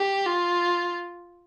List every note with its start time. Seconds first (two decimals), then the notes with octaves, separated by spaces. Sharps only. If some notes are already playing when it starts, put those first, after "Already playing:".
Already playing: G4
0.26 F4